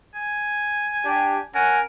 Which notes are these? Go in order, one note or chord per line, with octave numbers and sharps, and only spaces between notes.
G#5
D4 G4
C#4 A#4 F#5 G#5